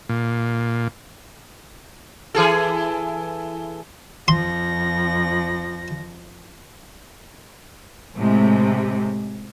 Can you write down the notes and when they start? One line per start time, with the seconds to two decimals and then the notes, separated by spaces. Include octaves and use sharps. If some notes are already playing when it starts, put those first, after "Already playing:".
0.09 A#2
2.35 E3 G#4 A4
4.28 F2 F3 C6 A#6
8.16 A2 C3 G#3